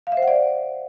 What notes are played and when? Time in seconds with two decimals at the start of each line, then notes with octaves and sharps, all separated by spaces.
0.07 F5
0.12 E5
0.17 C5
0.22 F#5
0.28 D5